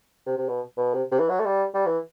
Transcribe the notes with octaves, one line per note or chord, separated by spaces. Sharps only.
C3
C3
B2
B2
C3
C3
E3
F#3
A3
G3
G3
E3